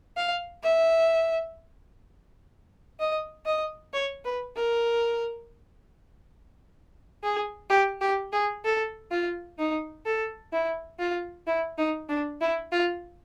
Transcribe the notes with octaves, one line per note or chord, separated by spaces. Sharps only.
F5
E5
D#5
D#5
C#5
B4
A#4
G#4
G4
G4
G#4
A4
F4
D#4
A4
E4
F4
E4
D#4
D4
E4
F4